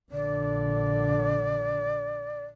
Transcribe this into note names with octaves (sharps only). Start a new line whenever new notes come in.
A#1 D3 D5